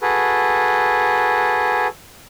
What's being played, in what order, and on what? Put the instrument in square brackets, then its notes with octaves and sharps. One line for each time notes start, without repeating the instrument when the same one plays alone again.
[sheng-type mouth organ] F#4 G#4 A4 B4